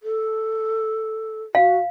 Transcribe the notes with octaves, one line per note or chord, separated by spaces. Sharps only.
A4
F#4 F5